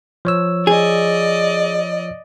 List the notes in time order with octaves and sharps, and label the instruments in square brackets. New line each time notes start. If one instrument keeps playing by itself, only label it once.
[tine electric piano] F3 C#5 E6
[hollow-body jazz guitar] G#4 [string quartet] D5 D#5